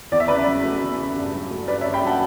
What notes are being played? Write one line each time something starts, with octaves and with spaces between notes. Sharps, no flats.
E2 D5
E5
C#3 B4 D5
F#3
A3
E2
C#3
G2
F#3
A3
G2 B4 D5
C#5 E5
G2
G5 B5
F#3 F#5 A5